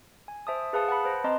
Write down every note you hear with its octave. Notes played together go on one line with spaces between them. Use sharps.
G#5
C5 E5 A5 D#6
G#4 B4 F5 A5 D#6 C#7
F#5 A5 B5
B4 C5 A#6
C4 B4 D#5 A5 A#5 C6